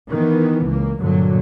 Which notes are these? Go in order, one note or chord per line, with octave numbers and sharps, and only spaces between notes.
D#3 E3 B3
C#2 A#3
G2 A#2 D3 F#3